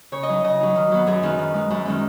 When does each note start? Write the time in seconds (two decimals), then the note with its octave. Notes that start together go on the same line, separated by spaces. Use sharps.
0.12 C#3 C#5
0.23 D#5
0.29 F#3 D#4
0.44 C#3 D#5
0.60 F#3 D#4
0.76 D#3
0.92 F#3 B3
1.07 F#2 G#4
1.23 D#3 B3 D#4
1.39 D#3
1.54 G#3 D#4
1.70 F#2
1.85 D#3 G#3 C#4